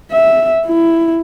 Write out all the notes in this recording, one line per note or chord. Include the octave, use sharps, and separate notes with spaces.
E5
E4